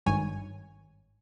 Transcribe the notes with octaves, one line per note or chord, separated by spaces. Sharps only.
G#1 G2 C#5 G#5